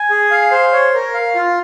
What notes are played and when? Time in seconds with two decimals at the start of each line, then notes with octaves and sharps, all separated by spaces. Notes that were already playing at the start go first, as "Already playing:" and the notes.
Already playing: G#5
0.10 G#4
0.31 F5
0.51 C5
0.73 C#5
0.94 A#4
1.14 F5
1.35 F4